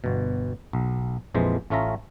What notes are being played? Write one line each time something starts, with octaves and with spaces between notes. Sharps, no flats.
G1 B2
B1
A#1 F2 E3 G#3 C5
A1 A3 C#4 F4 E5 A#5